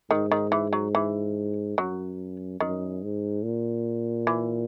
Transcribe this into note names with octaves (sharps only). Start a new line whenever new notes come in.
G#2 D#3
D#3
E3
F#3
E3
F#2 F#3
F#2 D#3
G#2
A#2
E3